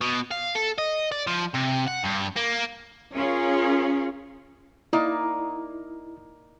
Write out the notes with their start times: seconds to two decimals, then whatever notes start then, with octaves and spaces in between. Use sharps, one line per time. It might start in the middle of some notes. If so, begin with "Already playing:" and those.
0.01 B2
0.31 F5
0.55 A4
0.78 D#5
1.12 D5
1.27 F3
1.54 C3
1.87 F#5
2.04 G2
2.36 A#3
3.14 C#4 F4 G#4 A#4 C#5
4.93 A#3 D#4 E4 D5